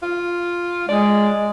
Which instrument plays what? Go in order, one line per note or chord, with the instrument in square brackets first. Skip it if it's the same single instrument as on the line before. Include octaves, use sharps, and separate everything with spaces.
[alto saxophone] F4
[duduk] G#3 [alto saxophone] D5